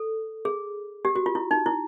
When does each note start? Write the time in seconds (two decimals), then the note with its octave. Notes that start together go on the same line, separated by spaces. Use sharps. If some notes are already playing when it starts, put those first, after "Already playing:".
Already playing: A4
0.45 G#4
1.05 G4
1.16 F#4
1.26 F4
1.35 E4
1.51 D#4
1.66 E4